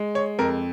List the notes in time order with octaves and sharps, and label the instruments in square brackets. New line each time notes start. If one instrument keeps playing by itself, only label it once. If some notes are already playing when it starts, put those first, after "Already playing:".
Already playing: [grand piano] G#3
C#5
F2 A#4